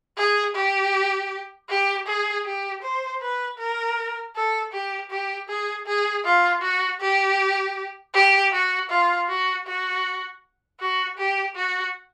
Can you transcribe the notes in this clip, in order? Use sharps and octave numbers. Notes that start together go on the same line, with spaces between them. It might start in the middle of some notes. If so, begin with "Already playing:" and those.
G#4
G4
G4
G#4
G4
C5
B4
A#4
A4
G4
G4
G#4
G#4
F4
F#4
G4
G4
F#4
F4
F#4
F#4
F#4
G4
F#4